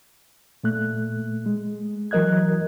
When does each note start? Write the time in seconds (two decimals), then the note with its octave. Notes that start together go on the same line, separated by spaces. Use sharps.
0.64 A#2 A3 F#6
1.46 G#3
2.11 E3 F#3 A#4 D#5 F#6 G#6